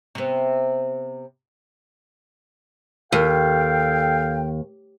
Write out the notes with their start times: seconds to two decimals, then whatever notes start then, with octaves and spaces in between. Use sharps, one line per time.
0.15 C3 B3
3.12 D#2 A4 F5 G5